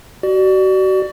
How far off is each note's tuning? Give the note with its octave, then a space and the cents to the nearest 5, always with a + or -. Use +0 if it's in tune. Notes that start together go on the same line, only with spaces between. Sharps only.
F#4 +35 D5 +20